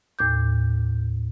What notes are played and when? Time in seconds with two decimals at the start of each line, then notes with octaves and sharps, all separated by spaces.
0.19 D#2 A2 D6 G6